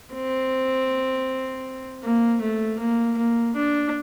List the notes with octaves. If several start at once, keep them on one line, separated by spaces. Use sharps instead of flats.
C4
A#3
A3
A#3
A#3
D4